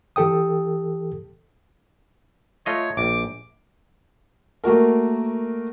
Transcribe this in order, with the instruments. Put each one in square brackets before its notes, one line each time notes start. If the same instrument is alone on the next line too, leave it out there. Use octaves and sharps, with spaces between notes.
[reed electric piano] E3 G4 A4 G5 D#6
[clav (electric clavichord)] A3 F4 D#5 [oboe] C#5
[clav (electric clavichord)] A#1 [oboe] D6
[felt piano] A3 A#3 F#4 A#4